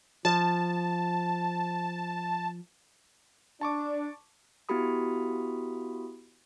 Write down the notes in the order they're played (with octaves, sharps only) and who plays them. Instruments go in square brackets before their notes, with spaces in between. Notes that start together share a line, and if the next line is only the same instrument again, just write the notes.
[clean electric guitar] F3 [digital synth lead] A5
[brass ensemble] D4 [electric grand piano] A5 C#6 D6
[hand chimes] B3 E4 F#4 G4 B5 D#6